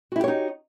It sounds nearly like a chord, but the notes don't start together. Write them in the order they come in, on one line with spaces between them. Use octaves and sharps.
F#4 E4 G4 C#5 D#4